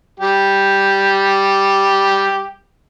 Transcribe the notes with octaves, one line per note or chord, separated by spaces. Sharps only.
G3 G4